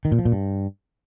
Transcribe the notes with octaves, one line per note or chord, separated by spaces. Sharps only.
D#3
A#2
F3
A#2
G2